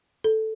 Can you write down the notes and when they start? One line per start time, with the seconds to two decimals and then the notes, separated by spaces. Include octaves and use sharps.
0.24 A4